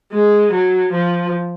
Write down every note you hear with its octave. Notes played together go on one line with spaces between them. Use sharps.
G#3
F#3
F3